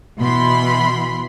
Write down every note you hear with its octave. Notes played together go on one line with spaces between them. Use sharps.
B2 E3 B5 C6